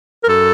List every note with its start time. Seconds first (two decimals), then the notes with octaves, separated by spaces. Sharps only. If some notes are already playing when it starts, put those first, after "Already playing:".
0.24 A#4
0.28 F#2 A4